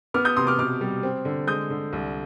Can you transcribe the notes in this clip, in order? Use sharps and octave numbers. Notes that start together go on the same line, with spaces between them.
B3 D6 F6
D#6 G6
C3 C6 D#6
D6 F6
B2 D6 F6
G3
C4
D3
G#3 D#6 G6
D3
C2